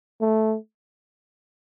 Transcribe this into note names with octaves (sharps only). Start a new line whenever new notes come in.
A3